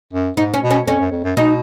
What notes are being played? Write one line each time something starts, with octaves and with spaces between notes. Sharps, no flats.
F#2
G#2 D#4
C#4
B2
C#4
F2 C#4
F#2
F2
F#2
B2 D#4